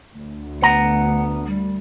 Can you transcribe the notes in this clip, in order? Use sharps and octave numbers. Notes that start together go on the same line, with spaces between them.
D2
B3 F#5 A#5
G3